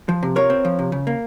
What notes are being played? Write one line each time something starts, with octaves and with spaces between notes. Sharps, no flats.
F3
C3
F4 A#4 C#5
C4
F3
C3
C#3
A#3